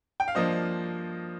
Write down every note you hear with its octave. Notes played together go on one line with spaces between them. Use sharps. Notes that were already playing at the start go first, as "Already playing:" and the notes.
G5
F5
G2 F3 A#3 D4 C5 D#5